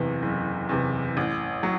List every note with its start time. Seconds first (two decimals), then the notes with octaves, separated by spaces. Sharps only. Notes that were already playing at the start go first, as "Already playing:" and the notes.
Already playing: F#1 E2 C3 E3
0.22 F#1
0.69 E2 C3 E3
1.17 A1
1.63 F#3